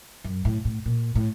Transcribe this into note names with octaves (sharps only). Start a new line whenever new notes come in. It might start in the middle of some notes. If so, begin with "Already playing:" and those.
F#2
A2
A2
A#2
A2